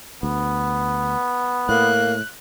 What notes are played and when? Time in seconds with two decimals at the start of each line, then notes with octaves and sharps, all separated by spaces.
0.23 D2 B3
1.69 A2 A#3 F#6